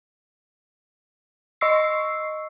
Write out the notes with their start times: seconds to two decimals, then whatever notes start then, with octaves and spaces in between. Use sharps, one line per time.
1.61 D#5 C#6 E6 C7